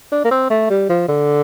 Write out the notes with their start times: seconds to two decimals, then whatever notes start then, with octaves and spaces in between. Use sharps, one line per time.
0.12 D4
0.25 A#3
0.31 C4
0.50 A3
0.70 G3
0.89 F3
1.08 D3